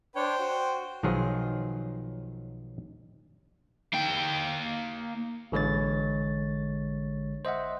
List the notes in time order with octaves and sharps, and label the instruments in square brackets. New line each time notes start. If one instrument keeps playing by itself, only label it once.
[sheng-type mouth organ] D4 C#5 [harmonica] C5 G5
[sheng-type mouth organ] F#4
[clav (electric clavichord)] B1 D#3 F3 F#3 F4 G#4
[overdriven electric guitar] A#3 G5
[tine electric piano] A1 D3 G#3 C#5 A6
C5 D#5 E5 F#5